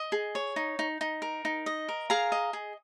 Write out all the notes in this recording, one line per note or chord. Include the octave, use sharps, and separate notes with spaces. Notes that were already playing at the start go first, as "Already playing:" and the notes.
Already playing: D#5
G#4
C#5
D#4
D#4
D#4
A#4
D#4
D#5
A#4
G#4 F5 A#5
D#5
G#4